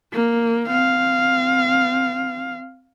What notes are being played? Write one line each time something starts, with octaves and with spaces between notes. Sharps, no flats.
A#3
C4 F5